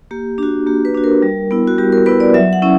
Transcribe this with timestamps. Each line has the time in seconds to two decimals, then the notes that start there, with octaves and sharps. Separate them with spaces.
0.11 A#3 G4
0.38 D4 F#4 G4
0.67 A#3 G4
0.85 B4
0.95 D4 F#4
1.04 A#4
1.22 G3
1.51 B3 E4
1.68 F#4
1.78 G3 G4
1.92 A#4
2.06 B3 E4 B4
2.20 D5
2.34 F#3 E5
2.53 F#5
2.62 C#4 E4